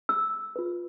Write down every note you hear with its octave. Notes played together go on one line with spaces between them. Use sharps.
E6
F4 B4